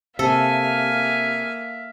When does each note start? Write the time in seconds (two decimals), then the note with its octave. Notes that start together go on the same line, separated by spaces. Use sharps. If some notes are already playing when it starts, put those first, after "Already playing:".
0.19 C3 A#3 A4 E5 F5 G#5